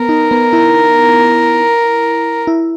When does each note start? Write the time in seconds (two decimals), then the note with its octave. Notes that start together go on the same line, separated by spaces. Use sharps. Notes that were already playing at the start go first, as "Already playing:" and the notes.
Already playing: B3 A#4
0.09 D#4
0.31 B3
0.53 E4
2.47 E4